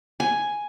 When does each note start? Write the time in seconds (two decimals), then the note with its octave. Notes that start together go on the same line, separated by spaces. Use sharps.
0.20 G#5